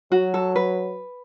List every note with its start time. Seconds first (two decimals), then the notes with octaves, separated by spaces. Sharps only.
0.12 F#3 F#4
0.34 A4
0.56 B4